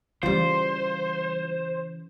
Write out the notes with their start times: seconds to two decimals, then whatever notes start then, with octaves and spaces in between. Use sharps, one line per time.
0.23 C#3 E3 G3 F4 C5